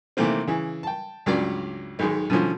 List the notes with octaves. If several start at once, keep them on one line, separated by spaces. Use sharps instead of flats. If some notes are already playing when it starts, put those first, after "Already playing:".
C3 D#3 E3 A3 A#3 C4
C#3 E3
G5 A5
C#2 G2 F#3 C#4 D5 D6
B1 G#2 D#3 G#3
B2 D3 E3 F3 C#4